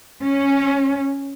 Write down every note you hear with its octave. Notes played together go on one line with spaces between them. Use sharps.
C#4